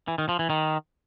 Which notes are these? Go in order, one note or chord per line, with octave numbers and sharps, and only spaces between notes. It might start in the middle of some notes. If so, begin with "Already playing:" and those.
E3
D#3
F3
E3
D#3